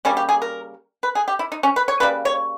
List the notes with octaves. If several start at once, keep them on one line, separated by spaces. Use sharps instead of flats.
C#3 G3 A#3 C#4
G4
G#4
A#4
B4
G#4
G4
E4
D#4
C#4
B4
C#5
C#3 G3 A#3 B4
C#5